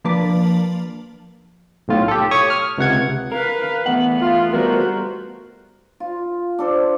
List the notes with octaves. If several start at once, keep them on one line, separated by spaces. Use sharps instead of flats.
F3 A#3 D4 B4 D5 A5
B1 A2 F4
G4 A4
C#5 C#6 D#6
F6
C#2 C3 F#5 G#6
A#4 B4 F5
E2 A3 B3 F#5
F4
G3 A3 B3 F#4 A#4 C5
F4
D4 A4 C5